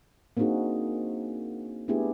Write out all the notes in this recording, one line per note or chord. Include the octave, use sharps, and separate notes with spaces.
A#3 C4 D4 D#4 F#4 G#4
A3 B3 D4 E4 G4 G#4